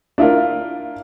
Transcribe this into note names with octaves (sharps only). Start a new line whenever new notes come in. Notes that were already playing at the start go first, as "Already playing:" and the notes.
D4 E4 F4 A#4